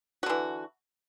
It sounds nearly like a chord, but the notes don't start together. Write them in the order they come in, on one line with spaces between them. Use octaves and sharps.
F#4 D3 E3